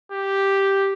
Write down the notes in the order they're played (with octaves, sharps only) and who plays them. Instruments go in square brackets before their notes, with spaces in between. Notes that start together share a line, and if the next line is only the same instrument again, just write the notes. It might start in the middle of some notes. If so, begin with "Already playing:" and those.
[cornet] G4